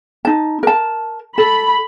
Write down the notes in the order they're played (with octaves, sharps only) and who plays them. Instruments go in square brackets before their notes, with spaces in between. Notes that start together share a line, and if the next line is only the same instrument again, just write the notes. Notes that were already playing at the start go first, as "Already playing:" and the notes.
[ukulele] D#4 A5
A#4 A5
[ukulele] A4 [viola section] B5